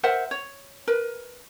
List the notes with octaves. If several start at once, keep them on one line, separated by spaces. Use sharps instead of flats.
A#4 C5 E5 F#5
C#5
A#4 B4